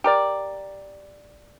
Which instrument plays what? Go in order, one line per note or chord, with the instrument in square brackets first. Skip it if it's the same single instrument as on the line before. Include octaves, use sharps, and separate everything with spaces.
[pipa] G4 A#4 D5